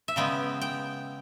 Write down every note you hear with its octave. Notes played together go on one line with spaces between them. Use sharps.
E5
C#3 G#3 B3 G5
G5